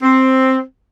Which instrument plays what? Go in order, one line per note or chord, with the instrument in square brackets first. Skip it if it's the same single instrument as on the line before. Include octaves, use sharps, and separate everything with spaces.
[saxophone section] C4